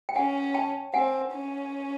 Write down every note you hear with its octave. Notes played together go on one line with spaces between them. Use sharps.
G5
C#4 F#5 G#5
G5 A5
C4 F#5 G#5
C#4